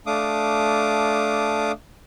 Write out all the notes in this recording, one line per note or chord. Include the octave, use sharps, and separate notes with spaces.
A3 D4 F5 D6 D#6